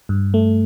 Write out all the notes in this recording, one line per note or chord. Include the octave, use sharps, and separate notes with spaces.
G2
A3